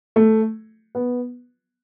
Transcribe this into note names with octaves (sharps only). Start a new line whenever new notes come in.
A3
B3